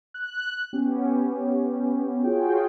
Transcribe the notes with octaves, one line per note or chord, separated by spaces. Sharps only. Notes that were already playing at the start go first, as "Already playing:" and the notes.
F#6
B3 C#4 G4
F4 F#4 G#4 C#5 G5